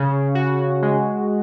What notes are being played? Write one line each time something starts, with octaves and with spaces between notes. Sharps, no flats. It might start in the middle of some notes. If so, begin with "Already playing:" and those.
Already playing: C#3
F#4
G#3